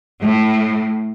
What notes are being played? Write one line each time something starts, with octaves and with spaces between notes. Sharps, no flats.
A2